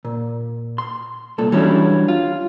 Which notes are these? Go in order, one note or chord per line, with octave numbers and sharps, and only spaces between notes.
A#2
C6
C2 A#2 A4
E3 F#3 G3 C#4 D4 E4
F4